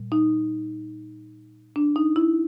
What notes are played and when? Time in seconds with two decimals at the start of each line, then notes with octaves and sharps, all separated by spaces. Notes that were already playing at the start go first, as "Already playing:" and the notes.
Already playing: A#2 G3
0.12 D#4
1.76 D4
1.96 D#4
2.16 E4